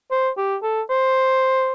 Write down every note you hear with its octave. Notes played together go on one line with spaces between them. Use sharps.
C5
G4
A4
C5